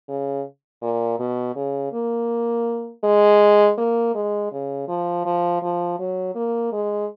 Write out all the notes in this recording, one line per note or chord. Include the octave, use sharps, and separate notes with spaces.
C#3
A#2
B2
C#3
A#3
G#3
A#3
G#3
C#3
F3
F3
F3
F#3
A#3
G#3